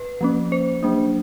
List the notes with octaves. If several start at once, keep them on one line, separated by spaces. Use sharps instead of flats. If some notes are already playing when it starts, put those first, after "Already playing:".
Already playing: B4
F3 A#3 C#4
C5
F#3 A#3 D4